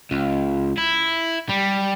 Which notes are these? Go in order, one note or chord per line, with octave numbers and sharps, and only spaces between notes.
C#2
E4
G3